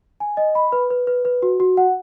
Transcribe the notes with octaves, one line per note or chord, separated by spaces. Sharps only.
G#5
D#5
B5
B4
B4
B4
B4
F#4
F#4
F#5